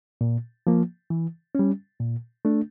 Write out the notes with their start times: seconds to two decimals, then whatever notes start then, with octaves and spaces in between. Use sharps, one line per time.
0.21 A#2
0.67 F3 A#3
1.10 E3
1.55 G3 C#4
2.00 A#2
2.45 A3 D4